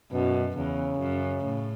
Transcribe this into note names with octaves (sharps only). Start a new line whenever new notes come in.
F#2 B2
E2 C#3
F#2
A2